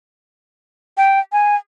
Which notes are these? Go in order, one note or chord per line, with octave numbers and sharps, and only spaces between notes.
G5
G#5